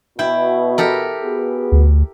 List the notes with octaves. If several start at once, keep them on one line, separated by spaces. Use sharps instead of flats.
B2 E4 G5
G4 A4 A#4
B3 F#4 G#4
D2